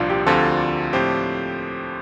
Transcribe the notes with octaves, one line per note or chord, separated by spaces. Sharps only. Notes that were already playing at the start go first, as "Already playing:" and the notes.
Already playing: C2 A#2 F3 A#3 D4 F4
G4
D2 D3 F3 C4 F4 A4
A2 F3 C4 G4 C5